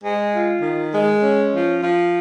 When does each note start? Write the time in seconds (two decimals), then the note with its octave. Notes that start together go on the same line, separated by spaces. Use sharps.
0.02 G#3
0.33 F4
0.62 D#3
0.92 G#3
1.22 C#4
1.53 F3
1.83 F3